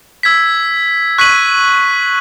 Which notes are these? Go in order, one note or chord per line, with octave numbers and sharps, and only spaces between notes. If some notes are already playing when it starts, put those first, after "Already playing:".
E6 G#6 B6
C#6 F#6 B6 D#7 F#7